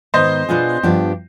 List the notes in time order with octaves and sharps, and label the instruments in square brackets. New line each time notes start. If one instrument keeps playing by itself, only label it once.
[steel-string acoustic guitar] G#2 D#3 B3 [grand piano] C5 D#5
[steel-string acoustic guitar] B2 B3 D4 F4 G#4
G2 F3 B3 D4 G4